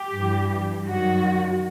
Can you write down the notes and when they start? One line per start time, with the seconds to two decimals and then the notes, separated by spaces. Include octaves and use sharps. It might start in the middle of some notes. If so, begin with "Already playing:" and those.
Already playing: G4
0.14 G2 E3 G3
0.86 F#2 D#3 F#3 F#4